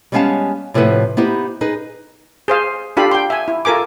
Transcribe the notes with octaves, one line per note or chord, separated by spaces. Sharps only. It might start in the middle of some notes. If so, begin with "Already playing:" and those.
G3 G#3 B3 C#4 F5 A5
A2 C3 F3 E4 B4 F#5
B3 D#4 E4 G4 C5
D#4 G#4 B4
G#4 C5 F5
D4 F4 G4 A4 F5 B5
G5 C6
E5 G#5
E4
F4 A4 A#4 G#5 D6